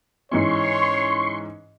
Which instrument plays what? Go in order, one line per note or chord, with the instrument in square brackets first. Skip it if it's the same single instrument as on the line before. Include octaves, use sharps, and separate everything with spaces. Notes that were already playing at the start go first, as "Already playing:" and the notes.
[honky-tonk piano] G#2 E3 C#4 [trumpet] C#5 [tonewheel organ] C6 C#6